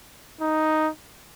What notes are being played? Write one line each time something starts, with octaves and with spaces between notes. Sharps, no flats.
D#4